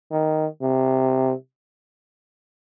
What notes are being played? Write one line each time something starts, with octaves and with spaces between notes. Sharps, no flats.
D#3
C3